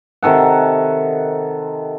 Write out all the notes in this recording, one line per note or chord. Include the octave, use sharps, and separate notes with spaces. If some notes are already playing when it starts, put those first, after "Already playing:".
C3 D#3 A4 F#5